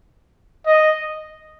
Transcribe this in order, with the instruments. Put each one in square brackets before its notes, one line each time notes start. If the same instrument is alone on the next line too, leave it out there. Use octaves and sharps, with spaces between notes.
[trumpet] D#5